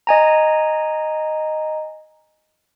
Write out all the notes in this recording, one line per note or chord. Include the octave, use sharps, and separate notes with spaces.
D#5 G#5 A#5